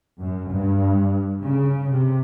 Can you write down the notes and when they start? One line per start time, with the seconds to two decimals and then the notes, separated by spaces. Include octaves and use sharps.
0.19 F#2
0.51 G2
1.41 C#3
1.91 C3